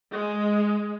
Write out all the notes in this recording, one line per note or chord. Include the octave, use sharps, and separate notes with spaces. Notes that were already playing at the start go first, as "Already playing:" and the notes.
G#3